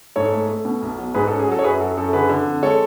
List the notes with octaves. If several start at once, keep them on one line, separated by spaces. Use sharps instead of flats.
G#2 A4 C#5
A3
A3
B2
B1
F#3
G#2 G#4 B4
A4
C#4
G#4
F#3 A4
C#5
F#2 G#4 B4
F#3 A4
F#2 A4
A4
D3 G#4 B4
D3
F2
G#3 A4 C#5